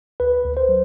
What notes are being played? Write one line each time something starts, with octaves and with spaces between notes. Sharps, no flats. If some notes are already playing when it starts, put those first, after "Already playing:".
D2 B4
D2
C5
F#3